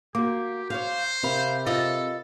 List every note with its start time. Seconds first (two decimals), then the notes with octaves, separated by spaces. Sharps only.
0.15 A#3 F#4 G4 D6
0.70 C5 C#5 F5
1.23 C3 A#4 F5 B5
1.66 F4 A4 D#5